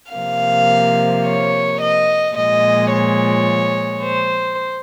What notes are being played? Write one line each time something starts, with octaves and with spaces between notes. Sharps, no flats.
C3 F3 A#3 F5
C#5
D#5
A#2 F3 G#3 D#5
C#5
C5